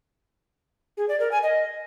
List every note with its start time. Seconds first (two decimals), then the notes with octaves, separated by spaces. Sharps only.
0.97 G#4
1.09 D5
1.20 A#4
1.31 G#5
1.43 D#5